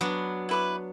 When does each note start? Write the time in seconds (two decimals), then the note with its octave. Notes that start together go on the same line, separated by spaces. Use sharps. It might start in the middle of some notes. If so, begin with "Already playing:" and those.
0.01 F#3 B3 D4
0.49 E4 B4 D6